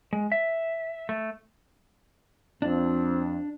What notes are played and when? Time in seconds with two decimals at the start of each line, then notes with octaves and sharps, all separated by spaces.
0.13 G#3
0.32 E5
1.09 A3
2.62 F2 C4 D4